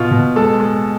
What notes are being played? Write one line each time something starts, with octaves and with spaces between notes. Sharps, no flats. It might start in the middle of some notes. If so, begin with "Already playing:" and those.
Already playing: B2 F4
B2
G#3 A4
G#3